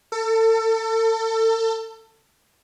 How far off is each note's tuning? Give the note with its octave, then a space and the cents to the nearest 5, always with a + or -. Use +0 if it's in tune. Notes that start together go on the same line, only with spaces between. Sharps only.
A4 +30